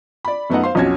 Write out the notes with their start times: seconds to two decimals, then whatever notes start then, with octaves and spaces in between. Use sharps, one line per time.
0.25 D5 B5
0.50 F#2 A3 B3 D#4 D#5 F#5
0.63 C5 F5 C6
0.75 B1 F2 C#4 F#4 G#6